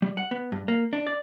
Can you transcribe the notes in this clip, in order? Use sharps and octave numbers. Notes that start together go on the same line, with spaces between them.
G3
F#5
B3
G2
A#3
D4
D5